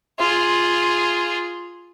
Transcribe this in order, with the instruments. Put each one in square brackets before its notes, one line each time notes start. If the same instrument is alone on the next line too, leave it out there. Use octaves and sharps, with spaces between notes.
[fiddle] F4 G#4